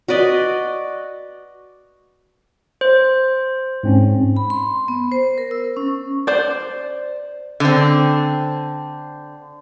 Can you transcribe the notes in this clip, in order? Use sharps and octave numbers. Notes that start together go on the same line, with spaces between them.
F#4 B4 D5 D#5
C5
G#2 C4 C#4
B5
C6
B3
C5
A#4
E6
C#4
C5 D5
D3 C4